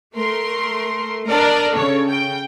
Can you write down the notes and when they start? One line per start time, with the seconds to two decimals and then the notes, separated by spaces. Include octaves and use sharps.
0.14 A3 A#4 C6
1.27 D4 A#4 D5 D#5
1.75 C#3 A4 C#5
2.08 G5